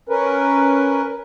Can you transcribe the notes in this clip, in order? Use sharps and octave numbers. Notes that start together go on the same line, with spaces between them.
C#4 A#4 B4